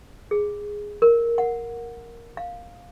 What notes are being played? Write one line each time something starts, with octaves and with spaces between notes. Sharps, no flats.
G#4
A#4
F#5
F5